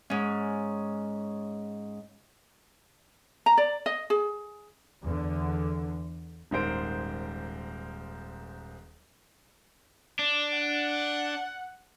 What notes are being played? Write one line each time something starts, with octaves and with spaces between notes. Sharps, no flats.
G#2 C#4
A#5
D5
D#5
G#4
E2 D3
D#1 G#2 A#4 C5 D7
D4
F#5